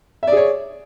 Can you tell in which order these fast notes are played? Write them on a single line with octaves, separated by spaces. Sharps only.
E5 D5 G#4 C#5